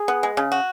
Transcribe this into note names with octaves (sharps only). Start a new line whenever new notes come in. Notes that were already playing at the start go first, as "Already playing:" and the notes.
Already playing: G#4
B3
G#3
C#3
F#4